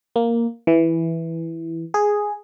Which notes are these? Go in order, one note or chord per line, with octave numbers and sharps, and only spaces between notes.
A#3
E3
G#4